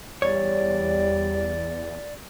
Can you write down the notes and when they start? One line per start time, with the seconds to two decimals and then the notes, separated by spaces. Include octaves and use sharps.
0.22 E2 G3 C#5 D5